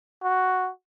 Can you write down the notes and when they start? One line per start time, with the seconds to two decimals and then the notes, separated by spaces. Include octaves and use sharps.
0.23 F#4